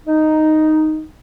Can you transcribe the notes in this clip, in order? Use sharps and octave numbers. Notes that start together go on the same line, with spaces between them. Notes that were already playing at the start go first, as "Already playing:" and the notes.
D#4